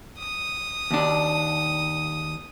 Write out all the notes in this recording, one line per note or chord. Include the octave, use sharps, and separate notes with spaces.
D#6
D#2 D4